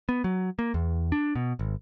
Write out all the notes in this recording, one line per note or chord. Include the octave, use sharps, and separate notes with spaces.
B3
F#3
A#3
E2
D4
B2
G#1